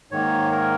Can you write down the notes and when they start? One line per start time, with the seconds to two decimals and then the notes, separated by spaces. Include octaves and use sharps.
0.11 G#2 D#3 A#3 C#5
0.52 A#4